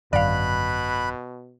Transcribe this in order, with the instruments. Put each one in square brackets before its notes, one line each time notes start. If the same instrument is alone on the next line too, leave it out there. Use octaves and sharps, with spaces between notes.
[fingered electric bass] G#1 F#2 D3 [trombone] B2 [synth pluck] D5 F5 [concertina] B5 F#6